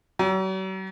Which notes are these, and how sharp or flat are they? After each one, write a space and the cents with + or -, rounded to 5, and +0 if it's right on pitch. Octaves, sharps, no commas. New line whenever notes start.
F#3 +45